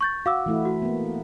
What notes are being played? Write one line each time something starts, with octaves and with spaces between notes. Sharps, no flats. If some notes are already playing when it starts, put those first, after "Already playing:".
C#6 G6 A6
F#4 F5 D6 E6
E3 A3 E4
F#4
A#3 B3